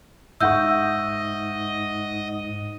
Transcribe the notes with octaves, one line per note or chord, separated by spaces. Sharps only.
G#2 D#5 E5 F#5 C#6 E6 G6